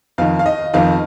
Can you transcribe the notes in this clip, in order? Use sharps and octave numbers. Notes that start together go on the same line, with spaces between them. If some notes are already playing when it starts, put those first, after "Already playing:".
F2 D#3 F5
F5
D#5
F2 D#3 F5